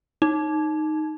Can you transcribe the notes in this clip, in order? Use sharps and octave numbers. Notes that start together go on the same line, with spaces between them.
D#4